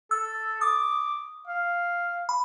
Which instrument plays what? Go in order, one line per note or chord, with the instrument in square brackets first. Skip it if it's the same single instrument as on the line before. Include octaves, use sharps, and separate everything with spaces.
[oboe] A4 [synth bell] E6
[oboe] D6 [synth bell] D#6
[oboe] F5
[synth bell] B5